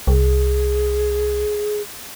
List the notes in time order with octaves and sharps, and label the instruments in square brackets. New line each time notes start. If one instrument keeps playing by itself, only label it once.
[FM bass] C2 [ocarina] G#4